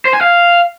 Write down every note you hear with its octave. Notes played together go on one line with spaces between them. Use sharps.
C5
G#5
F5